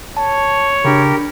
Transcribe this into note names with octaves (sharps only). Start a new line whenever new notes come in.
C#5 A5
C#3 D4 G4 A#4 B5